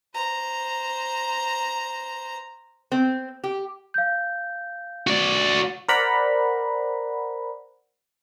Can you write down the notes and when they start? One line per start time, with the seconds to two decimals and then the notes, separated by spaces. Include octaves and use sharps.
0.14 C5 A#5
2.92 C4
3.44 G4
3.94 F5 G6
5.07 F#4 D5
5.88 A#4 C5 D5 F#5 A#5 B5